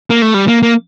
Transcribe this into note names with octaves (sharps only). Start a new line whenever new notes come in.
A#3
A3
G3
A#3
A#3